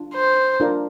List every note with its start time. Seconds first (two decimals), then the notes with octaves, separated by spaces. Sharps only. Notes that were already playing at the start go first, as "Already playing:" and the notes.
Already playing: D4 F4
0.14 C5
0.60 D4 F4 A#4 D5